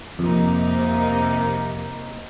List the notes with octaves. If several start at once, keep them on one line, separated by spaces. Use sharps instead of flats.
F2 C3 A#3 D#4